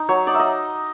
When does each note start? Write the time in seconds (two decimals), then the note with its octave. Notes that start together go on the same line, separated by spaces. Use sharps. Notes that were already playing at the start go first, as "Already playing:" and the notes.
Already playing: D#4
0.09 F#3 C#5
0.27 D#4 D5
0.34 E5
0.39 D#5